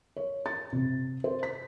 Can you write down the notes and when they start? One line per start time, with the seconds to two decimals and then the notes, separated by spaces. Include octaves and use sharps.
0.16 C#5
0.46 A6
0.73 C3
1.24 C5
1.43 B6